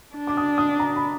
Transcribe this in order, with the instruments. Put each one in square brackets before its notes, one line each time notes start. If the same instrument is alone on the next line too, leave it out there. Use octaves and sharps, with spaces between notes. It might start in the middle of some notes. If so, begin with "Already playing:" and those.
[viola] D4
[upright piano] D6
D#6
D#6
A#5
B5